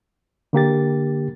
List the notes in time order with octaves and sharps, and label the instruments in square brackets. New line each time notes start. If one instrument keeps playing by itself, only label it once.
[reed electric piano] D3 A#3 G4 A6